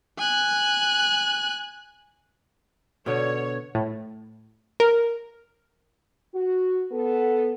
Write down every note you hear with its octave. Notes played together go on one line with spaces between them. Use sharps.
G#5 F#6
B2 D3 C#5
A2
A#4
F#4
B3 A4